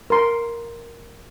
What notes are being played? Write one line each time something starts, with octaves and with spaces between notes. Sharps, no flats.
A#4 C6